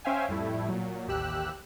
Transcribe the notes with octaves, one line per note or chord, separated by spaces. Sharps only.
C#4 C5 E5 F5 G5 G#5
F2 A2 G3 A3 E4
A#2 F#3
A1 D#2 G4 E6 F#6